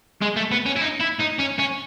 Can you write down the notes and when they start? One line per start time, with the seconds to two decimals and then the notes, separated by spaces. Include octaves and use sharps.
0.22 G#3
0.36 A3
0.51 B3
0.66 C#4
0.76 E4
0.81 D#4
1.00 E4
1.20 D#4
1.40 C#4
1.59 C#4